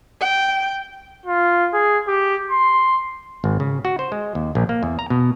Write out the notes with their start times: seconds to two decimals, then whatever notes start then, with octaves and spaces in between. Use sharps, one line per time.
0.21 G5
1.26 F4
1.73 G#4
2.07 G4
2.51 C6
3.44 G#1
3.60 C#3
3.85 F#4
3.99 C5
4.12 G#3
4.35 D#2
4.55 A#1
4.69 A#3
4.83 E2
4.99 A#5
5.10 B2